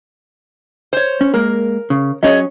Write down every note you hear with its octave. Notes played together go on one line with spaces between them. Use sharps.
C5 C#5
C#4
G#3 A#3 A#4
C#3
F#3 C#4 G#4 C#5 D#5